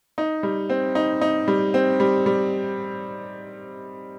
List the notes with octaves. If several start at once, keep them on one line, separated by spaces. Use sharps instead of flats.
D#4
G3
C4
D#4
D#4
G3
C4
G3
G3